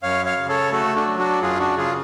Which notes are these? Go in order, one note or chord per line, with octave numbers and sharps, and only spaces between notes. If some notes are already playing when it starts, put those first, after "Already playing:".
F#2 C#5 F5
C#5 F5
C#3
A4 C#5
A3 F#4 A4
D4 F#4
F#3
D4 F#4
F#2 F4 G#4
D4 F#4
C#3 F4 G#4